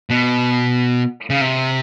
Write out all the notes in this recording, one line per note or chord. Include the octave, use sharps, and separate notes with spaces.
B2
C#3
C3